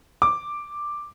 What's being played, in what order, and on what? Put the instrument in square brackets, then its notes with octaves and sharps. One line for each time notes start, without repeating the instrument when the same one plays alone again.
[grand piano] D6